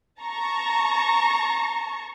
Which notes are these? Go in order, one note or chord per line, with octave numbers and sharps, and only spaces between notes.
A5 A#5 C#6